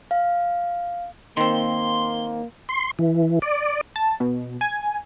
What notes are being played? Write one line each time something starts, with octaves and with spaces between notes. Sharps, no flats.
F5
D#3 A#3 C4 C6
C6
E3
D5
A5
B2
G#5